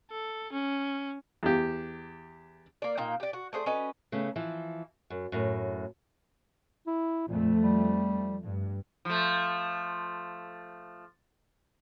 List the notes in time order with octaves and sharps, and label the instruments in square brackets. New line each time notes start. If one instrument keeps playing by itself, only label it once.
[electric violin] A4
C#4
[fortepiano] E2 G4
[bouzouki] A#3 D5
A#2 A#3 D#4 G5
G4 D5
F#4
A3 G#4 C5 D5
C#4 F#4 B4 D#5
[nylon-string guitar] C#3 A3 B3
E3 F3
F#2
F#2 A2
[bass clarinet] E4
[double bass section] F2 A3 [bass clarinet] A#2
[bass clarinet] G3
[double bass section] G2
[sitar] F3 A3